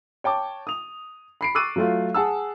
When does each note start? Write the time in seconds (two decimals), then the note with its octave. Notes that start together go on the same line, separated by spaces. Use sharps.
0.24 C#5 G5 A5 D6
0.67 D#6 F7
1.41 B5 C7 D7
1.55 C#6 D6 E6 F#6 A6 D#7
1.76 F#3 A3 F4
2.14 G#4 F#5 A5 E6